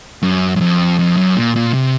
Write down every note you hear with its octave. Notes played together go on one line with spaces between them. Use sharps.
F#2
F#2
F2
F2
F#2
A#2
A#2
C3